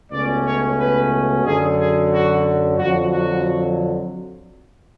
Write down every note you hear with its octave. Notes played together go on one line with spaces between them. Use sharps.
C#2 B2 A3 C#4 D5
C#5
B4
F#2 D3 F#3 G#4
G#4
F#4
F2 D3 F#3 F#4
F#4